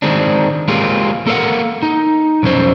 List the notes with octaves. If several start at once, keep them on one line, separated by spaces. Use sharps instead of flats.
D#3 G#3 C4 D4
G#3 A#3 C4 F4 G4 G#4
A#3 A4 A#4 C5 F5 F#5
D#4
B1 F2 C#4 C5